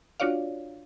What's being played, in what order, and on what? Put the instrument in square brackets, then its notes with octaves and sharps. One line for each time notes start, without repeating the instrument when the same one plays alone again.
[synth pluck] D4 F4 F#4 C#5 D5 F5